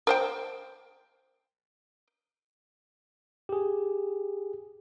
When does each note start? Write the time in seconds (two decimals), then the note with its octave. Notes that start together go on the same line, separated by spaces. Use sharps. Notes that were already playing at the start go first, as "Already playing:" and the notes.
0.07 A#4 C5 G5
3.49 G4 G#4